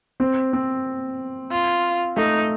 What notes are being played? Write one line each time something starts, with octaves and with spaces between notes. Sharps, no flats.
C4
C4
F4
A3 D#4